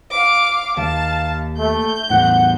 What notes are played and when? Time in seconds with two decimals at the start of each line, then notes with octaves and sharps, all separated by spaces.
0.11 F5 D6
0.77 D#2 F5 A5
1.59 A3 G6
2.10 E2 A2 F#5